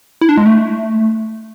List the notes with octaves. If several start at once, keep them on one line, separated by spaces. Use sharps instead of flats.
E4
D4
G#3
A3